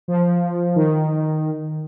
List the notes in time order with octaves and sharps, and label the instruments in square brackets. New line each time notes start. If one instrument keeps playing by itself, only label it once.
[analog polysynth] F3
D#3